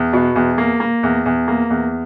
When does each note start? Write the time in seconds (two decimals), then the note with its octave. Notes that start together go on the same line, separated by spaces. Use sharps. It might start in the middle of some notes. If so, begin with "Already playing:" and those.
Already playing: E2
0.13 B2
0.35 E2
0.58 A#3
0.80 A#3
1.03 E2
1.25 E2
1.48 A#3
1.70 E2